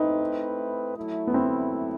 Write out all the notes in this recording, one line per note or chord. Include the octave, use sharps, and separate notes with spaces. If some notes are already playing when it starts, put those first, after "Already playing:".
Already playing: A3 C4 D#4 E4 B4
F#3 A3 E4
B3
C4